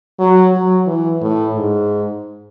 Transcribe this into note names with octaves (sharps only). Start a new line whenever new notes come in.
F#3
F#3
E3
A2
G#2